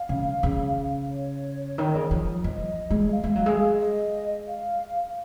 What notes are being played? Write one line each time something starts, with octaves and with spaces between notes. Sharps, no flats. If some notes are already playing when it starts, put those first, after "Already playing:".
Already playing: F5
C#3
C#3
C#5
D#3
C#3
F3
F3 D#5
G#3
D#5
F5
G#3
F#3
G#3
D#5
F5